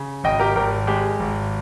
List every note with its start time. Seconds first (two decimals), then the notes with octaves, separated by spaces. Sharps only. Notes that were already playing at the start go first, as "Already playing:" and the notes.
Already playing: C#3
0.24 G#1 D#5 G5
0.40 G4 A#4
0.56 G#1 G4 A#4
0.87 G#3 G4
1.20 G#1